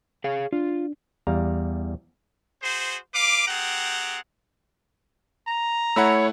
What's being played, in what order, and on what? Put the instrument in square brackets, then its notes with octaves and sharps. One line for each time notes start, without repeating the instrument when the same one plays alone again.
[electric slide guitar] G#4 C#5 F5
[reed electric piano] D4 [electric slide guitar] F4
[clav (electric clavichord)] E2 G3 F5 A#5
[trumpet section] F#4 G#4 C5
B4 F5 D6
C4 G4 G#4 F#5 A#5
[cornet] A#5
[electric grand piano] A3 E4 F#5 [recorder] C#5 [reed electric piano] B5 E6